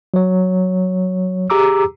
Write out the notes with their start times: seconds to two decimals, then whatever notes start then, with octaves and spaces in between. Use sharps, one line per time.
0.14 F#3 C#5
1.50 G4 G#4 A#5 D6 E6